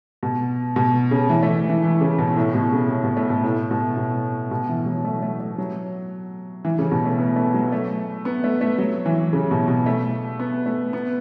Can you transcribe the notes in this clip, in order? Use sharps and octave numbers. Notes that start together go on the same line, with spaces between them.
B2
B2
C#3
E3
A3
E3
E3
C#3
B2
A2
B2
C#3
B2
B2
A3
B2
A2
B2
B2
B2
E3
F#3
A3
A3
A3
F#3
E3
C#3
B2
A3
B3
A3
F#3
A3
B3
A3
A3
F#3
E3
C#3
B2
B2
A3
B3
A3
B3